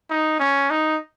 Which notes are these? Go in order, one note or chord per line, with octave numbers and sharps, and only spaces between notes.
D#4
C#4
D#4